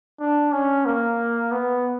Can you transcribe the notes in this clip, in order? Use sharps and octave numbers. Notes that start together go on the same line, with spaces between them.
D4
C#4
A#3
B3